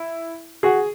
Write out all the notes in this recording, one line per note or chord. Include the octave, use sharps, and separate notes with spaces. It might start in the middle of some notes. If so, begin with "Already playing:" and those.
Already playing: E4
F#4 G#4